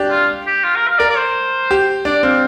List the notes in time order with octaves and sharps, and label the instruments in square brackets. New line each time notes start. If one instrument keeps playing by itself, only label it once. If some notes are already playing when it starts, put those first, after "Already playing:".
Already playing: [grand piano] D4 G4
[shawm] F4
G4
F4
A#4
F5
[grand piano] A#4 [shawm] D5
[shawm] D5
C5
[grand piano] G4
[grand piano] D4 [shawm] D5
[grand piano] C4 [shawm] F5